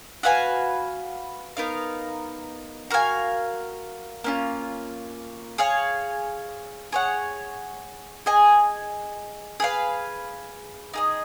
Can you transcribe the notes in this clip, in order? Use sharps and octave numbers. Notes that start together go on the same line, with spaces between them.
F#4 B4 F5 G#5
B3 D#4 A#4 F5
F#4 A#4 F5 G#5
A#3 C#4 F4
G#4 C#5 F5 G#5
G#4 C#5 F#5
G#4 D#5 G#5
G#4 B4 F5
D#4 G#4 D#5